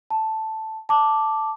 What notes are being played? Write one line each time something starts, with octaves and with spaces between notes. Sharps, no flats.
A5
A5 D6